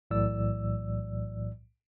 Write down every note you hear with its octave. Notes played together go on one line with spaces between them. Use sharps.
B1 A2 E3 F#3 D5 E6